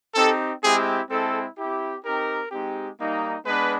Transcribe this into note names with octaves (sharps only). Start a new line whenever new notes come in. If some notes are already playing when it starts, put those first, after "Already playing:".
C4 D#4 G4 A4
G#3 C4 E4 G4 G#4
G#3 C4 E4 A4
C4 E4 G4
C4 D#4 G4 A#4
G#3 C4 D#4 G4
G3 A#3 D#4
G#3 B3 D4 B4